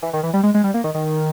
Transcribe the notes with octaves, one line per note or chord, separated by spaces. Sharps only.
E3
D#3
E3
G3
G#3
G#3
G3
A#3
D#3
D#3